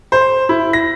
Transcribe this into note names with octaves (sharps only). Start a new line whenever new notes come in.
C5
E4
A#6